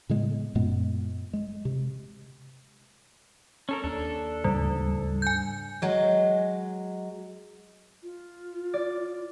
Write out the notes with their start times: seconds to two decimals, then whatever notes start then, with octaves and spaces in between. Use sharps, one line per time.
0.09 A2 C#3 G#3 B3
0.55 F#2 A#2 G#3 B3
1.33 G#3
1.65 C3
3.69 C#4 A4 A#4
3.84 D#2 D4 A4
4.44 D2 G#2 C#3 G3
5.22 G#5 G6
5.82 F#3 G#3
8.03 F4
8.74 D5